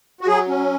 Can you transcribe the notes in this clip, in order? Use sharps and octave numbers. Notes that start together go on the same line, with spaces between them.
F#4
F#3 G#4
C#4